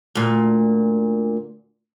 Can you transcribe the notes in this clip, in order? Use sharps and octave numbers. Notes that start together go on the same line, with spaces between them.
D2 A#2